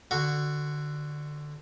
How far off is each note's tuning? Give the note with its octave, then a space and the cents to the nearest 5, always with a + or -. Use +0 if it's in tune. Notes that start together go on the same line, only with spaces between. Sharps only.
D3 +10 F#4 +0 C#6 +0